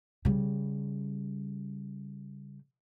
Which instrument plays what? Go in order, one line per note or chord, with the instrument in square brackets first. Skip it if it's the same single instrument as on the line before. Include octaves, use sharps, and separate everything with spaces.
[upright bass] C#3 G3